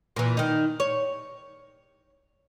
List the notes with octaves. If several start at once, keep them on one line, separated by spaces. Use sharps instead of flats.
A#2 E3
D#3 D#4
C#5